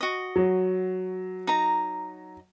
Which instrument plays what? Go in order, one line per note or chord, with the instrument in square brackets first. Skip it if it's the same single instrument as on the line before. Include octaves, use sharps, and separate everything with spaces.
[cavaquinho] F#4 D#5
[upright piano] F#3
[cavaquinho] D#4 A#5